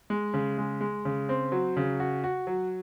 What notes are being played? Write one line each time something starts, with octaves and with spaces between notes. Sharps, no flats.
G#3
C#3
G#3
G#3
C#3
C4
F#3
C#3
F#4
F#4
F#3